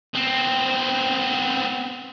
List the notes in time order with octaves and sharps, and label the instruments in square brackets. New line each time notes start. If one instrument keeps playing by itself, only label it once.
[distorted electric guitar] B3 C4